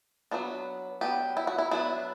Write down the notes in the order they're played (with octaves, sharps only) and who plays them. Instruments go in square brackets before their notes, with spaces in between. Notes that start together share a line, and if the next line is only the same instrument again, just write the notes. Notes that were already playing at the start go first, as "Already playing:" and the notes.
[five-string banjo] F#3 B3 D4
F#3 B3 D4 G4
E4
F#4
E4
F#3 B3 D4 E4